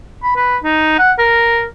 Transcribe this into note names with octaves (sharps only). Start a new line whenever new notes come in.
B5
B4
D#4
F#5
A#4